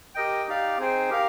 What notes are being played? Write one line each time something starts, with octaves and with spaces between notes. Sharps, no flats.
G4 A#4 D#5 G5
D#4 G4 D5 F5
C4 D#4 G#4 C5 G5
G4 A#4 F5